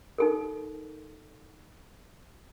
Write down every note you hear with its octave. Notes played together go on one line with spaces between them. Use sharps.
D#4 A4 A#4